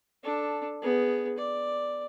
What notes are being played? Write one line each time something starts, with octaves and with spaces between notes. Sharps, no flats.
D4 A4
B3 G#4
D5